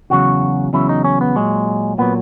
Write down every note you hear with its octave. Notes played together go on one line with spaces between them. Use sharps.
E2 C#3 F#3 F#4
E2 C#3 F#3 E4
D#4
C#4
B3
A#2 F#3 G#3
A#2 F#3 B3